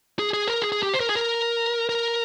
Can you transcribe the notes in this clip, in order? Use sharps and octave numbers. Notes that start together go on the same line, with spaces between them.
G#4
G#4
A#4
G#4
G#4
G4
C5
A#4
G#4
A#4
A#4